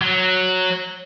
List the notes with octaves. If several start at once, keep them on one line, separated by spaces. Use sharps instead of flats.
F#3